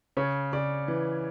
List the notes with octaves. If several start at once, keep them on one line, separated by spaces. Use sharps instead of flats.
C#3 C#5
C#3 D5
E3